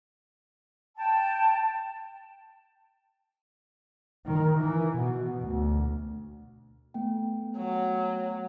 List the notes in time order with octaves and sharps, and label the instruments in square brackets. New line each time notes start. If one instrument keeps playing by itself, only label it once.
[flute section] G5 A5
[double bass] D#3
E3
B2
D2
[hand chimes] A3 B3 G5
[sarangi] F#3